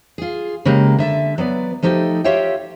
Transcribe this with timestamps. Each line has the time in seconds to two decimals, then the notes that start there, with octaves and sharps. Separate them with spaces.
0.18 F4 G#4
0.65 C#3 G#3 A#3 G4 A#5
0.99 D3 E5 A5
1.38 F#3 B3 B4 D5
1.83 F3 A3 D#4 G4 A4
2.24 F4 G4 C#5 E5 F5 G5